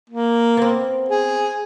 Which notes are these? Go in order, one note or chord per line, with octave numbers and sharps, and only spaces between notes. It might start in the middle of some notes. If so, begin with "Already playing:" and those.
A#3
B3 C4
G#4